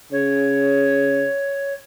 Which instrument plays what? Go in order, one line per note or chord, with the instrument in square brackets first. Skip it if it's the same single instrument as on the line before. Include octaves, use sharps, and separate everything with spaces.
[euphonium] C#3 [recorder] C#5